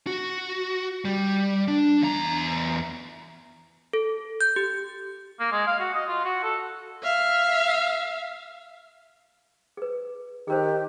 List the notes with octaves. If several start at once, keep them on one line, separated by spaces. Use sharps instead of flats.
F#4
G3
D4
E2 A#5
A4
G6
G4
A#3
G#3
F5
F#4
D#5
F4
F#4
A4
E5 F5
G#4 B4
D#3 G4 G#4 A#4 C5